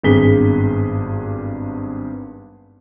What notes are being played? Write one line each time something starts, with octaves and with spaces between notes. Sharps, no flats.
G#1 G2 B3 G#4 B6 G7